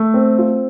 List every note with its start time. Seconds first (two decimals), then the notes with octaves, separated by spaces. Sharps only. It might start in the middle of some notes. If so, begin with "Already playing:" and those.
Already playing: A3
0.14 C4
0.39 F4